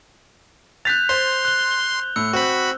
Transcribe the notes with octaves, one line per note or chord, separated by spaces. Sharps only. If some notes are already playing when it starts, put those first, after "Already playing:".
F#6 G6 A6 B6 F7
C5 C6
F#6 G7
A2 E6 C#7
C4 F#4 B5